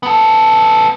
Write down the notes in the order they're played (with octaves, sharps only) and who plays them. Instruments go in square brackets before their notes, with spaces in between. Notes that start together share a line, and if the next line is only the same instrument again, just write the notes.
[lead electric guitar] B3 A4